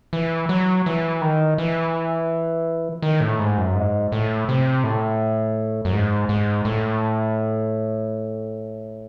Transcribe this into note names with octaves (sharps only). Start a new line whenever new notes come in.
E3
F#3
E3
D#3
E3
D#3
A2
G#2
F#2
G#2
A2
C3
A2
F#2
G#2
G#2
A2